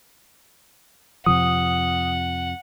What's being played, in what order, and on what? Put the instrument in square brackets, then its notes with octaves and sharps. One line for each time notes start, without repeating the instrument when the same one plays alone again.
[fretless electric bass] F2 C3 F3 [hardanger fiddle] F#5 [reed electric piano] D#6